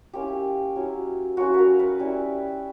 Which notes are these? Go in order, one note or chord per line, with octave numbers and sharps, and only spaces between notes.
A#3 C#4 E4 G4
F#3 C#4 E4
F#3 A#3 C#4 E4 F#4
A#4 B4
B4
G3 C#4 E4